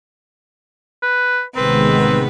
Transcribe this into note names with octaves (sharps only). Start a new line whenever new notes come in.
B4
A1 C3 D#3 G#3 B3 C4 B4